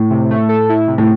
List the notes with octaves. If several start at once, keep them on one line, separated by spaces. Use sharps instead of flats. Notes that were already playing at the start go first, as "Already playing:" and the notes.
Already playing: A2
C3
A3
A4
E4
C3
A2